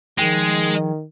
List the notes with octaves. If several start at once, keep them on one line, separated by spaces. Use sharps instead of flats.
D#3 F3 G#3 G#4 G5